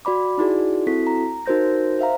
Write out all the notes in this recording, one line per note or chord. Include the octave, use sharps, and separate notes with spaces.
F#4 D5 B5 D6
D#4 E4 F#4 G#4 D5
C4 E4 F#4 A4 B6
A#5
D#4 F#4 A#4 C5 G6 A#6
C5 E5 F5 A#5